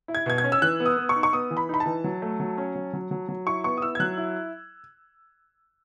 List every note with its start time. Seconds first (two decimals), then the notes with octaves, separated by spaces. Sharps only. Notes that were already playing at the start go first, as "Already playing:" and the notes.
0.08 E4
0.15 G#6
0.26 B2 G#6
0.38 G#6
0.44 C#4
0.52 E6
0.62 E3 F#6
0.80 B3
0.86 D#6
0.97 B3
1.09 C#6
1.16 D#4
1.23 C#6
1.33 B3 D#6
1.51 E3
1.57 B5
1.69 D#4 B5
1.80 A5
1.86 E3
2.04 F#3
2.22 A3
2.40 F#3
2.58 C#4
2.76 F#3
2.93 F#3
3.11 F#3
3.29 F#3
3.47 E4 C#6
3.64 B3 C#6
3.77 D#6
3.82 E4 E6
3.95 G#6
4.00 F#3 F#6
4.17 E4